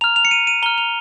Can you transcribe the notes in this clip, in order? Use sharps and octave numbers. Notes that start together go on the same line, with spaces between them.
A#5 F6 F7
F7
C#7
D#7
D#7
A#5 F6 G7
F7